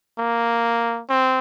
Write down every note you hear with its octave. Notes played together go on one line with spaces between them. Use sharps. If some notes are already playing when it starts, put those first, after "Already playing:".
A#3
C4